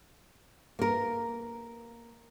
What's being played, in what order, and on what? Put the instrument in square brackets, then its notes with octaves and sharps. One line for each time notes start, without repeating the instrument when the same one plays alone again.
[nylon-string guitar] A#3 A#4